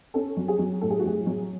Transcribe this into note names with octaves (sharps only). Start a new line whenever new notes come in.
C#4 A4
F#3
G#4
F#3
A2 A4
G#4
F#4
F#3 G#4
F#3